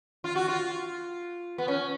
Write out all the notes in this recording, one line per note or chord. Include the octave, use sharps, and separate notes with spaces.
F4
F#4
F4
B3
C#4